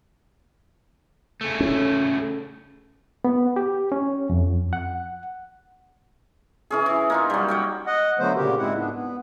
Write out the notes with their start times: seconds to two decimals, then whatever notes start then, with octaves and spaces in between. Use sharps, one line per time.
1.41 C#3 A3
1.60 C#4
3.25 B3
3.56 G4
3.92 C#4
4.30 F2
4.73 F#5
6.71 E3 C#4 G#4
6.86 E3
7.10 A#3 D#4 F4
7.30 F#3 G3
7.48 C#5 F#5 G5
7.87 D#5 F#5
8.19 D3 F#3 A3 B3 C5
8.36 A#2 C#3 G4 A#4
8.58 G#2 G#3 C4 E4 F#5
8.77 G#2 B3 D4
8.92 B3